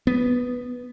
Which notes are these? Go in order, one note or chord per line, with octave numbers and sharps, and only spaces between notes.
B3